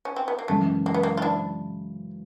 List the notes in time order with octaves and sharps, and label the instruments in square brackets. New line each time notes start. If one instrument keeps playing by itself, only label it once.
[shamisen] C#4
C4
B3
A#3
[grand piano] F#2 C#3 E3 G#3 [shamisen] A3
[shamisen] A#3
B3
A#3
F4
D4 E4